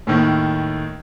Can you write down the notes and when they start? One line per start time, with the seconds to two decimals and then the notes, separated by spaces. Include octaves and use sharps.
0.07 D#2 A2 D#3